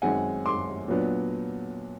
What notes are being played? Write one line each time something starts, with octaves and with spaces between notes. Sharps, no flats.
F#2 D#3 G#3 C4 F#5 G#5
C6 D6
A#2 F#3 B3 D4